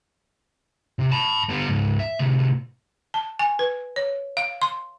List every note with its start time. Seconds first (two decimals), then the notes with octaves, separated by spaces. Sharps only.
0.99 C3
1.11 A5 B5
1.49 G3 B3
1.68 C#2 G#2
1.99 E5
2.19 A2 C3
3.14 A5
3.39 G#5
3.59 B4
3.96 C#5
4.37 F5
4.62 C6